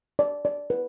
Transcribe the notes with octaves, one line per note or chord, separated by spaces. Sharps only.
D5
D5
B4